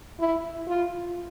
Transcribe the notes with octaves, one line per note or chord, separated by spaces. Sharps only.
E4
F4